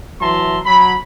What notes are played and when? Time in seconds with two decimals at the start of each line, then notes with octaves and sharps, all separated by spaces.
0.21 E3 F#3 E5 A5 A#5 C6
0.65 F#3 B5